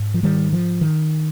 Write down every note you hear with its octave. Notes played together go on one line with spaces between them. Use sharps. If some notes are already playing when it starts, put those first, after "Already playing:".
Already playing: G#2
F3
D#3 G3
F3
D#3